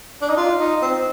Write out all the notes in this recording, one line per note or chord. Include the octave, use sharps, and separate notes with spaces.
D4
D#4
F4
D#4
C4